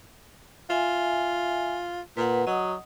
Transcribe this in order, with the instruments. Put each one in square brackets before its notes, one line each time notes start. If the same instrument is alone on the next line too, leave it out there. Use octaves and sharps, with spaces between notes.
[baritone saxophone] F4 [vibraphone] E5 G#5
[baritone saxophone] A#2 [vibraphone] B4 F#5
[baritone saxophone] F#3 [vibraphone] D#5 F#5 D#6